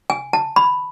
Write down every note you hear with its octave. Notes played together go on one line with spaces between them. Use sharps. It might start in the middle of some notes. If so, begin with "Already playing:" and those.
G#5
A5
B5